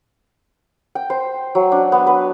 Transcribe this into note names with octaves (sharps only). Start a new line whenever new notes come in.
G5
C5
F#3
D4
B3
B4